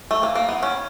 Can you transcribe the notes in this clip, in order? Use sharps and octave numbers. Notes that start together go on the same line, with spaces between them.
A3
A#3
A#3
B3
C#4